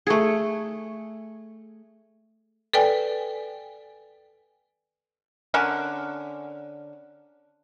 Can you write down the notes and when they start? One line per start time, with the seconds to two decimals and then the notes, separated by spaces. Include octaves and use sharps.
0.07 A3 G#4
2.73 A4 B4 D5 G5 G#5
5.54 D3 C#4 A#4 F#5